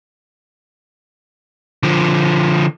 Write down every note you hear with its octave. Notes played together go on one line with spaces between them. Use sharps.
D3 F3